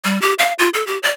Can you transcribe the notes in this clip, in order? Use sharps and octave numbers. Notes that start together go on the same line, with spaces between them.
G3
G4
F5
F4
A4
G4
D5